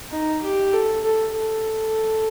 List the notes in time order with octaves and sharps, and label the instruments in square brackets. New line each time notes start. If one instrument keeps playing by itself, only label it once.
[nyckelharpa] D#4
G4
A4
A4
A4